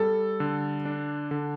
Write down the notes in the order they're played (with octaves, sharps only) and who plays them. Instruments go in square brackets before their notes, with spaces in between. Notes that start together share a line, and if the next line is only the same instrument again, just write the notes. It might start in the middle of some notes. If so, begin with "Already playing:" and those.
Already playing: [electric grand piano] G3 [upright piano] A4
[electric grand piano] D3
D4
D3